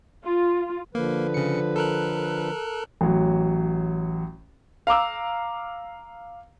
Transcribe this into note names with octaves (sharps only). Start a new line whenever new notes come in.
F4
D3 F3 A#3 B4
C#3 C#7
A4 A#4 F#6
A1 F#3
F5 A#5 D6 E6